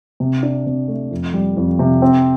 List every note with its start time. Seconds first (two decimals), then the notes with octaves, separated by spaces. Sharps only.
0.20 C3
0.43 D4
0.66 C3
0.88 A3
1.11 F2
1.34 G3
1.57 F2
1.79 C3
2.02 C4